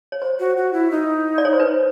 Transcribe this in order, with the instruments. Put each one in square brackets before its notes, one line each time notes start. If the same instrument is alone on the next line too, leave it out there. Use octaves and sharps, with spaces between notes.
[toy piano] C#5
C5
[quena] F#4
F#4
E4
D#4
[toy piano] D5
C#5
C5
B4